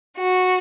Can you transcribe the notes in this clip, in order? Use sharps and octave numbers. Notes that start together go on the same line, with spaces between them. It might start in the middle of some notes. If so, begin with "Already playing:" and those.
F#4